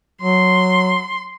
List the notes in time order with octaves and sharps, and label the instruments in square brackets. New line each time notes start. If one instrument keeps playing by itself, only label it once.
[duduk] F#3 [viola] C6